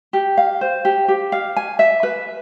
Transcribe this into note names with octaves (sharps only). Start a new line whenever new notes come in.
G4
F5
C5
G4
G4
F5
G#5
E5
B4